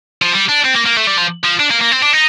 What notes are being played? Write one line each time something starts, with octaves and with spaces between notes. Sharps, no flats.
F3
G3
D4
C4
A#3
A#3
A3
G3
F3
F3
D4
A#3
A#3
C4
D4
D#4